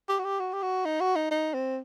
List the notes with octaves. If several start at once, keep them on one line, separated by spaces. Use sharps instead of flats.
G4
F#4
G4
F#4
G4
F#4
D#4
F#4
D#4
D#4
C4